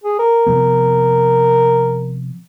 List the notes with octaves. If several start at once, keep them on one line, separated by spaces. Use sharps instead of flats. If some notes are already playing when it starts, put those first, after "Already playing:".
G#4
A#4
C3 F3 B3